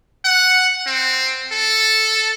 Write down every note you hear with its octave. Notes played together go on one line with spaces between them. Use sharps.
F#5
C4
A4